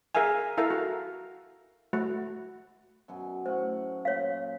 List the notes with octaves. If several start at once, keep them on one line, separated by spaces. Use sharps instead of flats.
G#4 A#4 E5 F5 G#5
E4 A4 A#4 E5 F5
F#4
A3 F#4
F#2 B2 G#5
A2 C5 F#5 C#6
A#2 C#5 F5